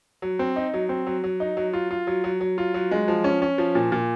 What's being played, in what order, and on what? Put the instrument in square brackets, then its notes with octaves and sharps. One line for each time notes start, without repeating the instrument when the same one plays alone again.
[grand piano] F#3
C4
D#4
F#3
C4
F#3
F#3
D#4
F#3
F4
F4
F#3
F#3
F#3
F4
F#3
G#3
F3
C#4
C#4
F3
A#2
A#2